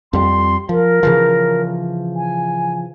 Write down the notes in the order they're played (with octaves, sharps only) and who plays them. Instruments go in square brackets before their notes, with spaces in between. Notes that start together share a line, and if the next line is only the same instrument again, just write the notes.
[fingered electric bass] F2 G3 [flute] C6
[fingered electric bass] F3 [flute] A#4
[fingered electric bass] C#3 E3 F3
[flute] G#5